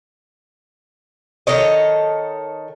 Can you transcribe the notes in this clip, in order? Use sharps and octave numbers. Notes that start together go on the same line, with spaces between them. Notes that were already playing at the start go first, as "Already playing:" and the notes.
D#3 A4 C#5 D#5